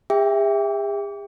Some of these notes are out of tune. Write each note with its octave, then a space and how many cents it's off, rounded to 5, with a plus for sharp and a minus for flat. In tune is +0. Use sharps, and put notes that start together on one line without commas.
G#4 -45 E5 +0 G5 +10